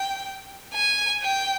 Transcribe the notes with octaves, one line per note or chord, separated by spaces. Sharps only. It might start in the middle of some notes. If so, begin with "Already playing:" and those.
Already playing: G5
G#5
G5